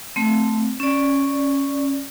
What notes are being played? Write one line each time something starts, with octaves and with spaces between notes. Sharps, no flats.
A3 C4
C#4 D5